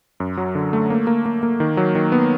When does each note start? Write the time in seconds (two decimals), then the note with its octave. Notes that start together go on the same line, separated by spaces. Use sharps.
0.20 F#2
0.37 F#3
0.55 D3
0.73 A3
0.90 A#3
1.07 A#3
1.26 A#3
1.43 A#3
1.60 D#3
1.77 F#3
1.95 D#3
2.12 B3